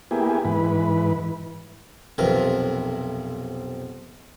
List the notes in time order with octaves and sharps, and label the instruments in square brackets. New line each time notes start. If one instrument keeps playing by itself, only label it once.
[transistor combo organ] A#3 B3 E4 G4 G#4
G#2 E3 B4
[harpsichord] B1 F2 C3 A#4 B4